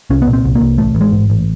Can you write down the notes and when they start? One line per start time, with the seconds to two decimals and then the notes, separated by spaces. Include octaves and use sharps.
0.10 C2 C#4
0.22 B3
0.28 A#2
0.33 C4
0.44 C2
0.55 A#3
0.61 C2
0.78 A1 A3
0.95 A1
1.01 G#3
1.12 G#2
1.30 A1